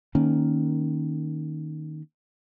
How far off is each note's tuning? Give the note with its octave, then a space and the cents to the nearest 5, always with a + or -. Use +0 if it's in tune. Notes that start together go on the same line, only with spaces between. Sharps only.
D#3 -5 A#3 +0 C#4 +0